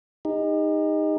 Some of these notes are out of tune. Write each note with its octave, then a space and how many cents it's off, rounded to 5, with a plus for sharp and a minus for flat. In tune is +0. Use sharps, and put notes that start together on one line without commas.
D#4 +0 G4 +45